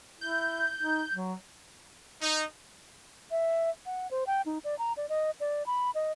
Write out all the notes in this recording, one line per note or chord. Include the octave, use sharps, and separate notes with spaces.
E4 G6
D#4
F#3
D#4
E5
F#5
C5
G5
D#4
D5
A#5
D5
D#5
D5
B5
D#5